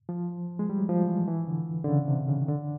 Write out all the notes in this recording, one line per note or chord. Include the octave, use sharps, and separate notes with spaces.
F3
G#3
G3
F#3
F3
E3
E3
D3
D3
C#3
C3
C#3
D#3
D3